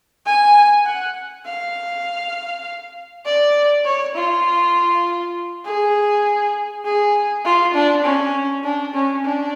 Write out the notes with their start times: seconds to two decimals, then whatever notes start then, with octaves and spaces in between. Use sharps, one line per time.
0.26 G#5
0.85 F#5
1.46 F5
3.26 D5
3.85 C#5
4.15 F4
5.65 G#4
6.85 G#4
7.45 F4
7.74 D4
8.04 C#4
8.64 D4
8.94 C#4
9.24 D4